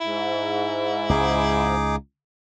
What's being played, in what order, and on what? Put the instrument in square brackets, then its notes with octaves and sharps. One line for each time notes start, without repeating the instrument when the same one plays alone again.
[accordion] G#2 [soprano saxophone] E4
[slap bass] C#2 [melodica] D#4 G#4 D6